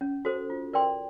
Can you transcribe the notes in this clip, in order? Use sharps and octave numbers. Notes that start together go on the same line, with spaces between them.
C#4
F#4 A4 C5
F4
A#4 D5 G5 C6